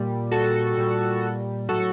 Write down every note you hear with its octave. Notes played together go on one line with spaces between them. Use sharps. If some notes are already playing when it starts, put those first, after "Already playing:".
Already playing: A#2 G3
F#4 A4
A#2 G3
A2 F#3 F#4 A4